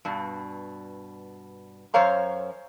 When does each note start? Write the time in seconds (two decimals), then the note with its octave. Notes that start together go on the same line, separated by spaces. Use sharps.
0.05 G2 B2
1.94 F#2 C5 C#5 F5 A#5